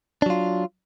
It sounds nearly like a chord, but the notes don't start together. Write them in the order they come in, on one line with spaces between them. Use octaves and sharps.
D4 F#3 F4